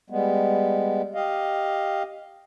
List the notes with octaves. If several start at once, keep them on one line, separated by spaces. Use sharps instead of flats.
G3 G#3 B3
G4 D#5 F5